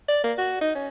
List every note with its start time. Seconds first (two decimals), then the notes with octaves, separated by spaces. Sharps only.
0.08 D5
0.24 A#3
0.38 F#4
0.61 D#4
0.75 C#4